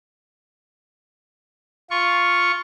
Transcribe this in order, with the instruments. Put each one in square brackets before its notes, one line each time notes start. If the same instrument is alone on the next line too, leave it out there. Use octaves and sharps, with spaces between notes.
[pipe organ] F4 C#6